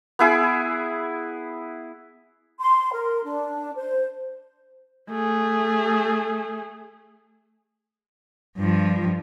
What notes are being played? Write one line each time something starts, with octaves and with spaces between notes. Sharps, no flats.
B3 E4 G#4
C6
A#4
D4
C5
A3 G#4
G2 F3